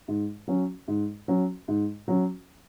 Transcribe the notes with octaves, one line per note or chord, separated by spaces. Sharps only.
G#2
F#3 C#4
G#2
F#3 C#4
G#2
F#3 C#4